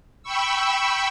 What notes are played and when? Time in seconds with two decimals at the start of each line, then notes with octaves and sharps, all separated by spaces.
0.23 G5 B5 C#6 E6